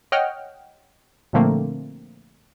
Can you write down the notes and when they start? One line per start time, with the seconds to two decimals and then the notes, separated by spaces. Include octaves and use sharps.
0.12 C#5 D#5 F#5 G5 F6
1.33 A#2 D3 F3 A3 A#3 C4